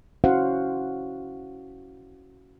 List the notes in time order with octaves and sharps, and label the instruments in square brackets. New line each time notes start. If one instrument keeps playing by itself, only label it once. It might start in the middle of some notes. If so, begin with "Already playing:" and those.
[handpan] C#4 E4 F#4 C5 F5 F#5